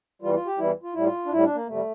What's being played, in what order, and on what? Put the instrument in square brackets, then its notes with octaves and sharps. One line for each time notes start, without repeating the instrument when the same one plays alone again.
[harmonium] E2 E3 G3 F4
F4
G4
E2 E3 G3 E4
F4
A2 G3 E4
F4
D4
A2 G3 E4
D4
A#3
F2 C3 G3 A3